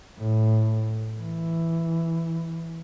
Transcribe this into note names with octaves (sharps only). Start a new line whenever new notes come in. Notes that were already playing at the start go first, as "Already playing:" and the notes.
A2
E3